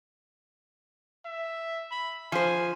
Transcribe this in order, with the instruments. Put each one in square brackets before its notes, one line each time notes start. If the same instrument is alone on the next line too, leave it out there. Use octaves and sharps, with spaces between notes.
[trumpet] E5
B5
[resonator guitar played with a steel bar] F3 C5 [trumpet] G#5